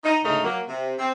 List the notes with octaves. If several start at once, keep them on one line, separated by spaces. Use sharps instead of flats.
D#4
D2 G#2 C#3 A3 D#4 A#4
F#3 A#3
C3
C4